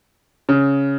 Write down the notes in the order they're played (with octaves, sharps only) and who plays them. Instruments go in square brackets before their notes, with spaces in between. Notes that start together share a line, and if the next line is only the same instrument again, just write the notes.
[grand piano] C#3